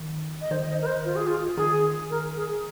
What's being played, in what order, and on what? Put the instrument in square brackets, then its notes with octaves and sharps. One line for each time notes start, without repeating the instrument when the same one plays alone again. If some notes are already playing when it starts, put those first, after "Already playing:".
Already playing: [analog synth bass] D#3
[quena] D#5
[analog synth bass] D#3 [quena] C5
[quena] D#5
A#4
C5
F4
G#4
F4
[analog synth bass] D#3 [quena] G#4
[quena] A#4
G#4